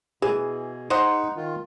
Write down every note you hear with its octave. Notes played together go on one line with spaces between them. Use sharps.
B2 E3 G#4
D#4 C5 D#5 F#5
D#3 F4